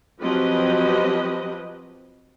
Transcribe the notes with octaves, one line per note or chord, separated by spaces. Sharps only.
F3 F#3 C4 G4 B4 D#5